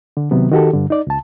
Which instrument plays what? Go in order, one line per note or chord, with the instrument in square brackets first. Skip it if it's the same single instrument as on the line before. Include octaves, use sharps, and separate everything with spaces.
[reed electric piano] D3
C3 D#3 F#3 B3
D#3 F#4 G4 A4
G2 D3
D#4 D5
C#2 A5